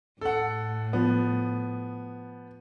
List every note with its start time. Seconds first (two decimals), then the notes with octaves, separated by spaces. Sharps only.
0.21 A2 A4 F#5
0.93 F3 B3